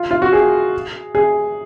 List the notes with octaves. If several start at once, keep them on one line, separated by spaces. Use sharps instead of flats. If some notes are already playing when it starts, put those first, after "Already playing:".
Already playing: F4
F4
F#4
G#4
G#4